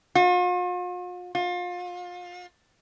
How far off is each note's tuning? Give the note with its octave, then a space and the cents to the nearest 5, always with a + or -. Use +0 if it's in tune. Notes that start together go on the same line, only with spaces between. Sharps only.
F4 +45
F4 +30